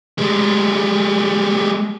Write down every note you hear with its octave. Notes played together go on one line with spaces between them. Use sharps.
G3 G#3